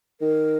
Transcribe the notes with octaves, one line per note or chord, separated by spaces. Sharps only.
D#3 A#4